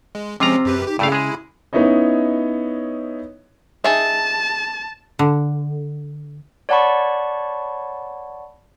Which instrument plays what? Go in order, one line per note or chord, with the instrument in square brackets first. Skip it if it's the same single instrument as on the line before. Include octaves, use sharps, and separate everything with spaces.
[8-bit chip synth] G#3
[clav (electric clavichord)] C3 F4 A#5 [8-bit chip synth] F3 G#3 C#4 [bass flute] C4
[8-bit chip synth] F#2 G4 B4
[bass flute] D#4 [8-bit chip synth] G4
[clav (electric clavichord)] G2 A3 F5 [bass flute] C#3 [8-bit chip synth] E4
[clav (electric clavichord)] G#3 G#4
[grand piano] B3 C#4 D#4 E4 C#5 D#5
[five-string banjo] D#4 G#4 E5 [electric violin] A5
[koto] D3
[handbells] C#5 D5 F#5 A5 B5 C#6